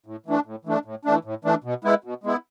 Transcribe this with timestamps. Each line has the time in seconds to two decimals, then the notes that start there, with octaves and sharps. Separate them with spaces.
0.06 A2
0.26 E3 A3 D4
0.46 A2
0.65 E3 A3 D4
0.85 A2
1.05 E3 A3 D4
1.25 A2
1.45 E3 A3 D4
1.64 B2
1.84 G#3 B3 E4
2.04 B2
2.24 G#3 B3 E4